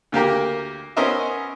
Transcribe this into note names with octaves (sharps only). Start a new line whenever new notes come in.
D2 A#3 G4 A#4
B3 C#4 A#4 C5 D#5 E5